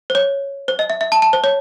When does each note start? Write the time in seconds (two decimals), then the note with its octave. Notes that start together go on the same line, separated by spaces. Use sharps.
0.10 C5
0.15 C#5
0.68 C5
0.79 D#5
0.90 E5
1.01 E5
1.12 A5
1.22 A5
1.33 C5
1.44 C#5